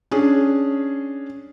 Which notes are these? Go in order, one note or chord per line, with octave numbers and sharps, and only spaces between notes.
C#4 D4 G#4